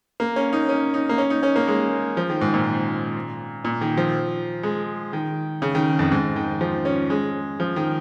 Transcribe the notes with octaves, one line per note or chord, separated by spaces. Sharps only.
A#3
C#4
D#4
C#4
D#4
A#3
C#4
D#4
C#4
A#3
G#3
F3
D#3
G#2
A#2
A#2
D#3
F3
G#3
D#3
C#3
D#3
F2
G#2
D#3
F3
C#4
G#3
F3
D#3